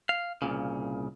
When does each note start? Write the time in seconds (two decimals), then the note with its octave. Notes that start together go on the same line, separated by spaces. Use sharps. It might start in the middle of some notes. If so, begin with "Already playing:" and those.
0.09 F5
0.42 C2 G2 A#2 C#3